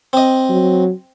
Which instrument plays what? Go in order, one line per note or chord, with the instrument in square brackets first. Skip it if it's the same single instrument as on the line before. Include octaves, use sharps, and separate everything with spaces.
[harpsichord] C4 D#5
[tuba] F#3